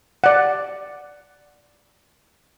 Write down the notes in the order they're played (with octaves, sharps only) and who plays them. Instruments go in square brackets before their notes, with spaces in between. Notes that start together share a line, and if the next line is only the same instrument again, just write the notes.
[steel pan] D5 F#5